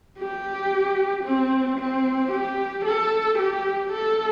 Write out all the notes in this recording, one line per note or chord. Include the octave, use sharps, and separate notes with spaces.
G4
C4
C4
G4
A4
G4
A4